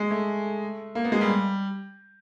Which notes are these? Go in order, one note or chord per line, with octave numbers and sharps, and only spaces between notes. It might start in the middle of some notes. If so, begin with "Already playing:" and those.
Already playing: G#3
A3
A#3
B3
G#3
G3